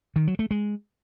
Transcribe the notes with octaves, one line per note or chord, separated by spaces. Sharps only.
D#3
F#3
A3
G#3